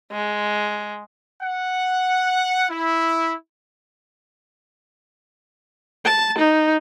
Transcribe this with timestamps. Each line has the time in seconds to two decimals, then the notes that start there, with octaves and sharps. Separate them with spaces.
0.12 G#3
1.42 F#5
2.70 E4
6.05 A5
6.39 D#4